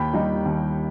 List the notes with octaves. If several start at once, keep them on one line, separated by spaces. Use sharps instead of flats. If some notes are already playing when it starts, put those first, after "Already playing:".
Already playing: D#2 G5 B5
D#3 G3 D#4
D#2